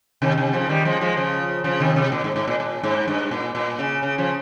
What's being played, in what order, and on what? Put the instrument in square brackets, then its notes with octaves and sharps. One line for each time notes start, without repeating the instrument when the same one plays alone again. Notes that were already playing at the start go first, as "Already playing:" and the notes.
[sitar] C3 D#3
C3 D#3
C#3 F3
D#3 G3
F3 G#3
F3 G#3
C#3 F3
C#3 F3
C3 D#3
C3
A#2
G#2
G#2
A#2
A#2
G#2
G2
A#2
A#2
C#3
C#3
C#3 F3